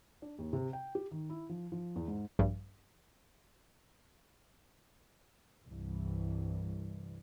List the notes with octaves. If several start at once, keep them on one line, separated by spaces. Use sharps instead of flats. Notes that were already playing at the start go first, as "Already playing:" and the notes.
D4
D#2
C3
G5
G4
D#3
E4
F3
F3
E2
G#2
A#1 G2
C2 G2 E3